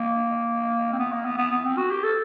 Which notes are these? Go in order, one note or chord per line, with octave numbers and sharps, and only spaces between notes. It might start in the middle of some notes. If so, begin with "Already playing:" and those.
Already playing: A#3
C4
B3
A#3
B3
B3
B3
C4
F#4
G4
A4